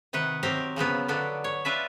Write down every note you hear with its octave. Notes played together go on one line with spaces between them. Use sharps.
C3 D#3 B4 F#5
F#3 C4 G4 A#4
C#3 F3 F#3 B3
D3 F#3 B3 D4
C#5
D4 F4 B4 D5 E5